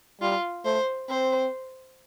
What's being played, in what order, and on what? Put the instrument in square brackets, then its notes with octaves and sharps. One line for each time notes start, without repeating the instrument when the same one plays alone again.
[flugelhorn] G3 [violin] F4
[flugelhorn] A3 [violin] C5
[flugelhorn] C4 [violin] C5